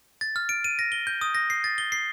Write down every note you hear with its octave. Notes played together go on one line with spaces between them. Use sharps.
A6
F6
D7
D#7
A#6
G7
G6
D#6
A#6
C7
A6
G7
C7